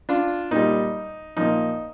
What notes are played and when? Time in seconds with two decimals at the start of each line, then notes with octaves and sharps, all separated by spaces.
0.09 D4 F4
0.51 A#2 G3 D#4
1.37 A#2 F3 D#4